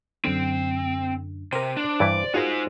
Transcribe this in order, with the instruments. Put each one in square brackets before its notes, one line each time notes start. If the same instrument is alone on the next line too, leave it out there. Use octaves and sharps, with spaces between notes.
[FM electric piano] F#2 D3 [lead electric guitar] C4
[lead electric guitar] C3 [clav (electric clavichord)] A#4 G5 [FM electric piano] C5
[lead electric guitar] D4
[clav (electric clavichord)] G2 E3 E4 [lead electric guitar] D5
[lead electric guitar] D#4 C5 [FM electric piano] F4 [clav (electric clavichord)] F#4 G#4 A#4